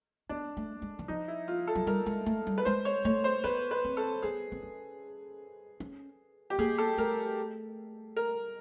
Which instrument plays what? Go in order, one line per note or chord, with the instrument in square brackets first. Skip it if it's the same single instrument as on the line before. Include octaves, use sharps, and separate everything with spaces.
[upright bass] B3 [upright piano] D4
[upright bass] A3
G#3
E3
[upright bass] F3 [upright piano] D#4
[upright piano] E4
F4
A4
[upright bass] F#3
[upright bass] G3 [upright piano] A#4
[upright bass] G#3
A3
G3
[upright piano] B4
[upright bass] G#3 [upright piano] C5
[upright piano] C#5
[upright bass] A3 [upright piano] C#5
[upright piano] C5
[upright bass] B3 [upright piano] B4
[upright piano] B4
[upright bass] C4
[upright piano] A4
[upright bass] B3 [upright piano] G#4
[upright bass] C4
C#4
C#4
[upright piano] G4
[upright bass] A#3 [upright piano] G#4
[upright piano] A4
[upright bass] A3 [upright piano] A#4
[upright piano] A#4